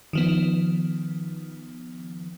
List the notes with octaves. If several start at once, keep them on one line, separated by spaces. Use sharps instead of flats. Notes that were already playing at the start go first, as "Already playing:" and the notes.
D#3 F3 B3